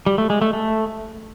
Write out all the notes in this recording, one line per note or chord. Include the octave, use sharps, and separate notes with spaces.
G3
A3
G#3
A3
A3